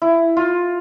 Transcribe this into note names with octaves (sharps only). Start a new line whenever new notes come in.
E4
F4